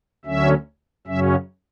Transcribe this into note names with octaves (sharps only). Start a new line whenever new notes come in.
D2 D3 F#3 C#4 E5
F#2 C#3 F#3 C#4 E5